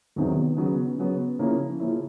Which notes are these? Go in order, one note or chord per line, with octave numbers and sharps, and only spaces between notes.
E2 C3 D#3 F#3 B3
C#3 F#3 B3
C#3 F#3 B3
C#3 F3 A#3 C#4 E4
C#3 F3 A#3 C#4 E4